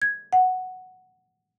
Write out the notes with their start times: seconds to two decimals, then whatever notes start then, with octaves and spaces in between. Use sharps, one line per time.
0.02 G#6
0.33 F#5